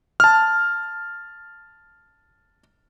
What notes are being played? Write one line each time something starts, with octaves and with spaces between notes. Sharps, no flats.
A5 F6